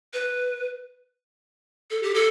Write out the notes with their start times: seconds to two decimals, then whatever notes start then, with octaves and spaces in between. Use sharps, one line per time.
0.14 B4
1.91 A4
2.03 G4
2.14 A4